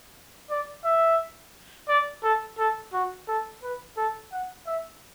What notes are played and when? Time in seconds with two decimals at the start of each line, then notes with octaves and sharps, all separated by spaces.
0.50 D5
0.85 E5
1.88 D5
2.23 A4
2.59 A4
2.93 F#4
3.28 A4
3.63 B4
3.97 A4
4.32 F#5
4.67 E5